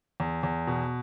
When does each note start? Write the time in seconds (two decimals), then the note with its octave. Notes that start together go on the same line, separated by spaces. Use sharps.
0.20 E2
0.43 E2
0.67 B2